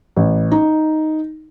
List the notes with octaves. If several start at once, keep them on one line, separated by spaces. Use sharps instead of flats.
A1
D#4